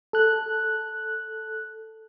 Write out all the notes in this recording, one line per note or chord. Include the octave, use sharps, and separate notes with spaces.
A4 F#6